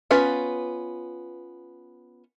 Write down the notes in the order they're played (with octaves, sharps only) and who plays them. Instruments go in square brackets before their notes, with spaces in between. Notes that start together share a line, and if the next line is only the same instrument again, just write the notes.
[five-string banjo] B3 C#4 F4 B4